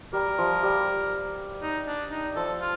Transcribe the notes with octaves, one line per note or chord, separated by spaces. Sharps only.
G3 A#4
F3
G3
D#4
D4
D#4
F3 A4
F4